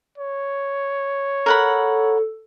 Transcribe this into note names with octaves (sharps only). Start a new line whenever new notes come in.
C#5
A4 A#4 F#5 B5